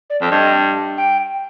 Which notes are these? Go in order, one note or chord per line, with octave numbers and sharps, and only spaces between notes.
D5
F2
G2 D#5
G5